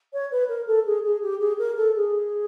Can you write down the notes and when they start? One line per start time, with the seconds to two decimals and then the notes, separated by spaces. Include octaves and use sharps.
0.13 C#5
0.31 B4
0.48 A#4
0.67 A4
0.86 G#4
1.04 G#4
1.22 G4
1.40 G#4
1.58 A#4
1.76 A4
1.95 G#4